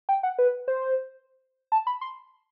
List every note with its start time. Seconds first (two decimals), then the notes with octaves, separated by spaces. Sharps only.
0.09 G5
0.23 F#5
0.39 B4
0.68 C5
1.72 A5
1.87 B5
2.01 C6